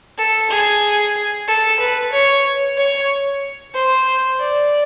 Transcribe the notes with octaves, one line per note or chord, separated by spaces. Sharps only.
A4
G#4
A4
B4
C#5
C#5
C5
D5